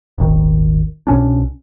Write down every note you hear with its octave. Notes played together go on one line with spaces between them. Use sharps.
D#1 G#1 D#3
C2 B2 C#4 D4